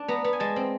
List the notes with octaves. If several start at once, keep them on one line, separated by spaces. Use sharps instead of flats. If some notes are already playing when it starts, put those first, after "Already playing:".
Already playing: D4
B3 A#5
B3
G#5
G#3 A5
C4